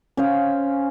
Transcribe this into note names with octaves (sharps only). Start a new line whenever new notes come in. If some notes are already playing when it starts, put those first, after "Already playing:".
C#4 C5 F5